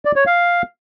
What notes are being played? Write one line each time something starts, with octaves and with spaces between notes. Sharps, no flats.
D5
C#5
F5